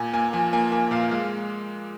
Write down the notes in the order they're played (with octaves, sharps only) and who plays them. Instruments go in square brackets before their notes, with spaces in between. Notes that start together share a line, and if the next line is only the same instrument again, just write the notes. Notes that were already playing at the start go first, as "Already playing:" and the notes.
Already playing: [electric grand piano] A#2 [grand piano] G#5
[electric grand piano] A#3 [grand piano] G#5
[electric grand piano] F3 [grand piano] G#5
[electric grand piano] A#3 [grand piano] G#5
[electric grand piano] A#3 [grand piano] G#5
[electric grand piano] A#2 [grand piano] F5
[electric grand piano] G#3 [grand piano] F5